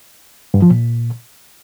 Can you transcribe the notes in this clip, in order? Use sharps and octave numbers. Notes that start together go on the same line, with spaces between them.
G2
F3
A#2